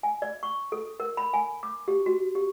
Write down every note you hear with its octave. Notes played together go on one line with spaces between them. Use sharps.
G#5
D5
C#6
A4
A#4
B5
G#5
D6
G4
F#4
G4